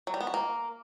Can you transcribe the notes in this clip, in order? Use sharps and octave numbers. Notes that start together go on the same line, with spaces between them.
F#3
G3
B3
F#4
A#3